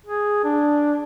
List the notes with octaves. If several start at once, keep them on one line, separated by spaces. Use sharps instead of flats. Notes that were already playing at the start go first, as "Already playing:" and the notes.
G#4
D4